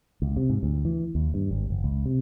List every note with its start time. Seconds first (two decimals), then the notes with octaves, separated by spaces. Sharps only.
0.22 C#2
0.37 C3
0.50 G#2
0.63 D2
0.85 E3
1.15 D#2
1.34 G2
1.51 G#1
1.70 F#1
1.84 C#2
2.06 C3